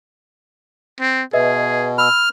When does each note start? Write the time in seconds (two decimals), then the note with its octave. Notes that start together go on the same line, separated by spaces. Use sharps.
1.00 C4
1.33 B2 G#4 B4 D#5 E5
1.98 B5 E6 F6